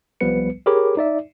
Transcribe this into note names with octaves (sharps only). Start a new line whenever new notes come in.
C2 F3 G3 B3 B4 C#7
G4 G#4 A#4 C#5 B5 D6
D#4 D5 E5